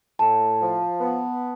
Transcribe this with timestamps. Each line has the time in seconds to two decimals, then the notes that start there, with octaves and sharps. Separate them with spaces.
0.19 A2 A5
0.60 F3
1.01 B3